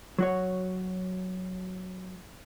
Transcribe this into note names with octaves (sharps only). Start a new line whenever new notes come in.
F#3 F#4 C#5